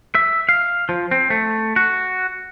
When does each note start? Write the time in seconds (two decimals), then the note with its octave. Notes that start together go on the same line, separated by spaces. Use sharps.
0.15 E5
0.49 F5
0.89 F3
1.11 C4
1.30 A3
1.76 F#4